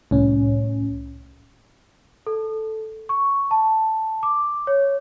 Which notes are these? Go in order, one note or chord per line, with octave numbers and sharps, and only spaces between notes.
C2 A2 C#4
A4
C#6
A5
D6
C#5